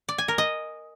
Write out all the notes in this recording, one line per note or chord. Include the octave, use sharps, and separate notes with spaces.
D5
G#5
A#4
D#5